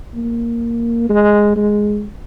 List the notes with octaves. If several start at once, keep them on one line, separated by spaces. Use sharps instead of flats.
A#3
G#3
G#3